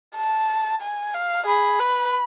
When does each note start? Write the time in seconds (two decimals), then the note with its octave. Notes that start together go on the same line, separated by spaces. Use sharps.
0.16 A5
0.81 G#5
1.14 F5
1.47 G#4 B5
1.79 B4